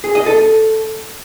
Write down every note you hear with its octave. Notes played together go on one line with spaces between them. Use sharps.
G#4
D#5
A4